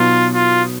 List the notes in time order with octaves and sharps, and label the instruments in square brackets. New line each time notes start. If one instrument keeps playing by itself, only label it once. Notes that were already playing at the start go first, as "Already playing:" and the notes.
Already playing: [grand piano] B2 F#3 B3 D#4 [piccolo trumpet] F4
[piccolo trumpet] F4